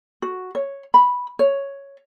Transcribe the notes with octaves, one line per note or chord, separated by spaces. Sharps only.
F#4
C#5
B5
C#5